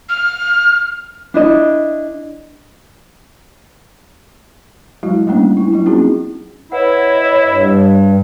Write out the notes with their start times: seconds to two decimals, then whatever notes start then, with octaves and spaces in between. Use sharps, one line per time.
0.09 F6
1.34 D4 E4 D#5
5.03 F#3 G#3 E4 F#4
5.27 G3 A3 A#3 C#4 D4
5.57 E4
5.73 F#3 E4 F4
5.86 A#3 C4 C#4 D#4 F#4 G#4
6.72 E4 B4 C#5 D#5 F#5
7.47 G2